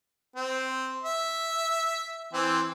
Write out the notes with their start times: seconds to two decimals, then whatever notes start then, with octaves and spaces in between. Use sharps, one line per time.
0.36 C4
1.03 E5
2.33 E3 C4